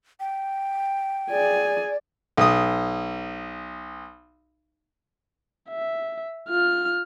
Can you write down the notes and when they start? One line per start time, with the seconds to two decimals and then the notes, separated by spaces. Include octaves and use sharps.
0.20 G5
1.31 G#4 D5 G#5
2.37 B1 D#6
5.69 E5
6.49 F4 F6